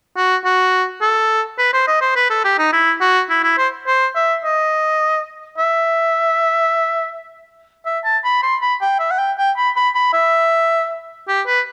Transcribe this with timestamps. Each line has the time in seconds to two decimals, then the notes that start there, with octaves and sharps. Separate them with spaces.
0.17 F#4
0.45 F#4
1.02 A4
1.59 B4
1.73 C5
1.87 D#5
2.01 C5
2.16 B4
2.30 A4
2.44 G4
2.59 D#4
2.73 E4
3.01 F#4
3.30 E4
3.44 E4
3.58 C5
3.87 C5
4.15 E5
4.44 D#5
5.58 E5
7.86 E5
8.04 A5
8.24 B5
8.43 C6
8.62 B5
8.81 G5
8.99 E5
9.11 F#5
9.19 G5
9.38 G5
9.57 B5
9.76 B5
9.95 B5
10.13 E5
11.28 G4
11.47 B4